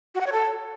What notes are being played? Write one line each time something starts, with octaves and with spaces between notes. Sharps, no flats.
F#4
F#5
C#5
A4